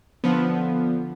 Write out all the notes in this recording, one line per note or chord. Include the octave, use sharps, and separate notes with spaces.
D3 F3 B3